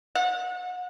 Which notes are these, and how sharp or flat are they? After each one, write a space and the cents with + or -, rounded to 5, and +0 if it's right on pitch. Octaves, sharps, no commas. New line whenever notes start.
F#5 -35